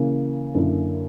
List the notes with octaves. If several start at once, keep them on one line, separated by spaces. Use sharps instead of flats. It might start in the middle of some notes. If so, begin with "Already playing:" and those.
Already playing: C#3 E3 A#3
F#2 D3 A#3 E4